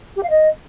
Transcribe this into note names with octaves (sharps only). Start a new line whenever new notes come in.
G4
F5
D#5